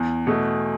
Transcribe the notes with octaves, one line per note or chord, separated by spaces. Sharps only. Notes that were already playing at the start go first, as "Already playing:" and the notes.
Already playing: E2
B2 A3